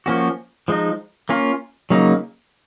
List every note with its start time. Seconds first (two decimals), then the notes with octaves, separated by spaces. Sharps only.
0.06 F3 A#3 C#4 F#4
0.68 F3 G#3 D#4
1.29 A#3 C#4 F4
1.90 C#3 F#3 A#3 D#4